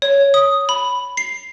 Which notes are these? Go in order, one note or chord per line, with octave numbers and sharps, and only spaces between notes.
C#5
D#6
B5
C7